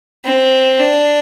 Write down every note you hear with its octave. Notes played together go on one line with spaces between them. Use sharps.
C4
D4